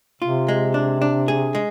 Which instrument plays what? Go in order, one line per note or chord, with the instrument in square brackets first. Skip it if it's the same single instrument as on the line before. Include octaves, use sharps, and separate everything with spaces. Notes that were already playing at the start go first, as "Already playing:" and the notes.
[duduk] C3 [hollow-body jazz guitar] F4
[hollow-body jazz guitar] G#3
D4
D4
G#4
G#3